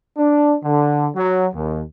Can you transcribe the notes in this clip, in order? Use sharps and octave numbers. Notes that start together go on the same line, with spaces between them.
D4
D3
F#3
D#2